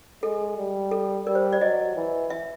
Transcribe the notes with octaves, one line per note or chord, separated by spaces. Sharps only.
G#3 A4
G3
A4
G3 A#4
C5
D5
F#3 D#5
E3
E5